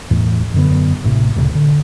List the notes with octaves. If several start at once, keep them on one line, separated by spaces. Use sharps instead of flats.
E2 A2
F#2 D3 B3
A1 A2 C3
D2 G2 A#2 C#3
D3